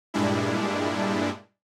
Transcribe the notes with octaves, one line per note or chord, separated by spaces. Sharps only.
G2 A#2 G3 G#3 D4 E4